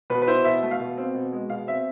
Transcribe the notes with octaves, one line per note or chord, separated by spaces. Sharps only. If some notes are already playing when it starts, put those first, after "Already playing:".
B2 B4
B4
E4 C5
B2 E5
A3
F5
B2
C4
B2
G#3
B2 F5
C4 E5